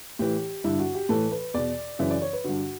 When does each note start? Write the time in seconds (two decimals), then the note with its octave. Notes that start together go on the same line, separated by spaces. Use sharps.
0.19 A2 E3 G4
0.64 G2 D3 E4
0.79 F#4
0.95 G4
1.09 A2 E3 A4
1.32 B4
1.54 E2 B2 D5
1.99 F#2 C#3 E3 E5
2.11 D5
2.22 C#5
2.33 B4
2.44 G2 D3 F#4